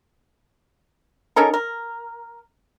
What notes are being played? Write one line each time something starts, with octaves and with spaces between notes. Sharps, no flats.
C#4 D#4 A4 A#4
A#4